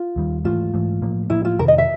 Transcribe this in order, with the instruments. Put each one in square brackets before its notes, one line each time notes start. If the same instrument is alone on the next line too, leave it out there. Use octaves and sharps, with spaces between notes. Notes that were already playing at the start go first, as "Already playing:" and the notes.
Already playing: [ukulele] F4
[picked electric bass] D#2 D#3 G3
[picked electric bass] G#2 E3 A3 [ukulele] F4
[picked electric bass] G#2 E3 A3
A2 F3 A#3
[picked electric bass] A2 F3 A#3 [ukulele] E4
[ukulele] F4
[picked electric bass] F2 C3 D#3 [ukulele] A#4
[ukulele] D#5
E5